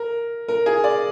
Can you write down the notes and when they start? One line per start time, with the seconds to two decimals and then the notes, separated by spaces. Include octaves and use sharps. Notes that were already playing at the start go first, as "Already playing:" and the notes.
Already playing: A#4
0.48 A#4
0.66 G#4
0.84 D5